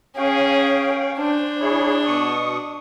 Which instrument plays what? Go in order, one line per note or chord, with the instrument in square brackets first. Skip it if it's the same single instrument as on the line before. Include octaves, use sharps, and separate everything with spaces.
[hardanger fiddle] C#4 G#4 [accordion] C#5 F5 G5
[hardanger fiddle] D4 [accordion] C5
[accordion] E4 G#4 C#5
B2 C#6 D#6